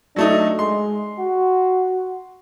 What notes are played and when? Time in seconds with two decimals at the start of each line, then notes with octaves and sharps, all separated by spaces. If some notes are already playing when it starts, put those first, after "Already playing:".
0.16 F#3 A3 D4 D#4
0.59 G#3 C6
1.19 F#4